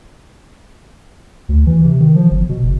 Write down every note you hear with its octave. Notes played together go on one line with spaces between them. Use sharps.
D2
E3
C3
D#3
F3
G1
B2
F#1